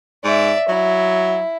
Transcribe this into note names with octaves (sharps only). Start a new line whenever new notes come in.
G#2 D5 E5
F#3 E4